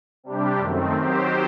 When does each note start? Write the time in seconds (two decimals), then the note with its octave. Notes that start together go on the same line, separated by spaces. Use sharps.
0.24 C3 G3 D4 G4
0.58 F#2 D#3 A3 C4
0.94 D#3 F#3 C4 G4 C5